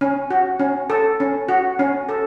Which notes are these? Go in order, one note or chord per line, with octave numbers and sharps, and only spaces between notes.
C#4
F#4
C#4
A4
C#4
F#4
C#4
A4